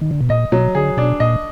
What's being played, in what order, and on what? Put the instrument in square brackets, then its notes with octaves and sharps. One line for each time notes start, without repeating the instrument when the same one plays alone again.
[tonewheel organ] D#3
D3
B2
[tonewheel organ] A#2 [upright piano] D#5
[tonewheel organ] B2 [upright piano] F#3
[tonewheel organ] D3 [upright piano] G#4
[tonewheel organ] B2 [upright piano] D4
[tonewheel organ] A#2 [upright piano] D#5